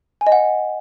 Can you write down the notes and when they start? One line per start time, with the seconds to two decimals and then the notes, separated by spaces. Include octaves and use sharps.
0.21 G#5
0.27 D#5
0.32 F#5